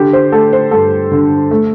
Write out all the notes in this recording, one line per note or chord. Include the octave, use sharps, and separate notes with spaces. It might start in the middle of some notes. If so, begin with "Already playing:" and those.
Already playing: D3 G4
C5
A3 A4
C5
G2 A4
D3
A3